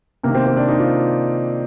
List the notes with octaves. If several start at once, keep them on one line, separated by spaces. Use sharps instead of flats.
C3 D#3 A#3
C4
C4
D4
D#4
F4